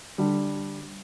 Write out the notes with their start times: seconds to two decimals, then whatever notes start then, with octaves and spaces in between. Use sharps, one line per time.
0.18 D3 G3 D4